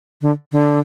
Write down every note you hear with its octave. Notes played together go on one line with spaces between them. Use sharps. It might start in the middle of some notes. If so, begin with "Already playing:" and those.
D3
D3